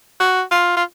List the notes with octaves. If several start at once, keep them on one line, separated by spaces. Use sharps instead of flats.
F#4
F4
F4